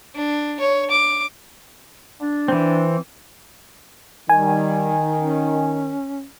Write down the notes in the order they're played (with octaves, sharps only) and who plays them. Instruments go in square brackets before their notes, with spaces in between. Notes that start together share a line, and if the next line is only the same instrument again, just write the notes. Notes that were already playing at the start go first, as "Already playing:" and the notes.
[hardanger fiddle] D4
C#5
D6
[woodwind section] D4
[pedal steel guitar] E3 C4
[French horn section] D#3 [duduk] G3 [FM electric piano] G#5
[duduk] C#4